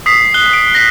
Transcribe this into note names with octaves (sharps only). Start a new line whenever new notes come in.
D#6 B6 C7
F#6 G7
D7
A#6 B6 G7